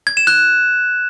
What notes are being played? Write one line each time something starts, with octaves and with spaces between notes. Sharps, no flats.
G#6
E7
F#6